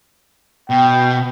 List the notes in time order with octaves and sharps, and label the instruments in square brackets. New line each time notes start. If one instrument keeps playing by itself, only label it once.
[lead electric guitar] B2 [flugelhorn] G5